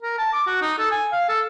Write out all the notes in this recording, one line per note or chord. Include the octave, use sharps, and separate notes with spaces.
A#4
A5
D6
F#4
D#4
A4
G#5
F5
A4